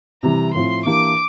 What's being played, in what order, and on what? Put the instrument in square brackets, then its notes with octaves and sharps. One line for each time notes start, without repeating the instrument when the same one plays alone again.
[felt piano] C3 E3 G3 [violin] A#5
[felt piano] A2 F3 C4 [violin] C6
[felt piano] E3 A#3 D4 G4 [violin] D6